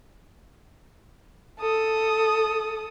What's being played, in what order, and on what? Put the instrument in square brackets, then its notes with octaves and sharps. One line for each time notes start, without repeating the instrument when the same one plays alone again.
[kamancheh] A4 D#6